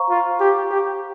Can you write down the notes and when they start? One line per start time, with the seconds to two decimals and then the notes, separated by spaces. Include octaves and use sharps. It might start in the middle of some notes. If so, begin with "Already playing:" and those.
Already playing: C5 F5 A#5 C#6
0.10 F4
0.40 G4
0.71 G4